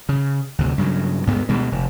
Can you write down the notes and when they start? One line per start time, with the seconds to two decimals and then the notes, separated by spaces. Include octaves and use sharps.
0.09 C#3
0.59 D2 C3
0.78 G2 C#3 F#3
1.26 D2 G2 G#3 B3
1.49 D2 B2 G3 G#3
1.72 F1